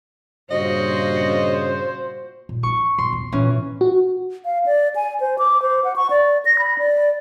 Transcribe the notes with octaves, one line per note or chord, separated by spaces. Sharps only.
G2 A#2 C#3 F4 F#4 C5 D#5
A#2
C#4 D4 C#6
B2 C6
E2
A#2 E3 F3 C#4
F#4
F5
D5
G#5
C5
D6
C5
F#5
C#6
D5
A#6
B5
D5